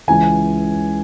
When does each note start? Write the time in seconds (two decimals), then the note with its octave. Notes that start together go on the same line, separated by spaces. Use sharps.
0.08 C#2 C#3 E3 G#5